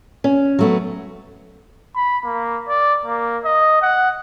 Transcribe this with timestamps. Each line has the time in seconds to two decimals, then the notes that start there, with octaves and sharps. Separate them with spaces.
0.24 C#4
0.59 F#3 A3 B3
1.96 B5
2.25 A#3
2.69 D5
3.06 A#3
3.45 D#5
3.82 F#5